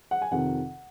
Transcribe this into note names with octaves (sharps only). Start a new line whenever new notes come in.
F#5
G#5
F2 C3 D#3 F#5